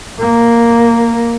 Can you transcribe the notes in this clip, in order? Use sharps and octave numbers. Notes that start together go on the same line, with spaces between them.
A#3